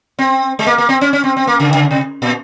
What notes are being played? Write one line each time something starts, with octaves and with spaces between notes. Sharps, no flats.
C4
G#3
A#3
A#3
C4
C#4
C#4
C4
C4
A#3
C#3
D#3
C#3
C3
A#2